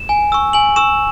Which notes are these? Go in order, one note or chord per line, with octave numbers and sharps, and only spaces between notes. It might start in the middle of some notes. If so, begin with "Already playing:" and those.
Already playing: E7
G#5
C#6 E6
G#5 F#7
C#6 E6 E7